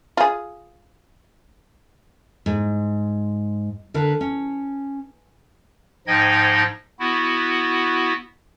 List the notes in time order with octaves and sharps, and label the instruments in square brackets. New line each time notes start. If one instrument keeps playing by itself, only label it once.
[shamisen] F4 G#4
[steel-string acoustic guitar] G#2
D3 A#4 B4
C#4
[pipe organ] G#2 F3 D#4 D#5 G5 G#6
B3 E4 F#4